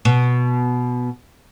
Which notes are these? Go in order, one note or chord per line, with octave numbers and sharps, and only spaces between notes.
B2